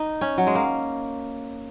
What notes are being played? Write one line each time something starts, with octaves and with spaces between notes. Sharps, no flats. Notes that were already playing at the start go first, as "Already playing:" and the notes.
Already playing: D#4
C#4
F#3
G#3
A#3